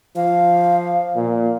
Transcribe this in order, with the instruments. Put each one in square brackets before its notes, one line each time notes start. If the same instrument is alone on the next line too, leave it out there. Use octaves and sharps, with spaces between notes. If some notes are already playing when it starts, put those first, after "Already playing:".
[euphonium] F3 [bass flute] F5
[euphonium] A#2